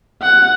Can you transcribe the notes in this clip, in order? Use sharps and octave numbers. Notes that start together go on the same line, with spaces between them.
F#5